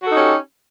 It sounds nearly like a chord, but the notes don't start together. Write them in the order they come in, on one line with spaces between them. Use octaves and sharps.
F#4 A4 D#4 C#4 G4